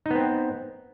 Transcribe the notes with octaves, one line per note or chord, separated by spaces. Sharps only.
B3 C4 D#4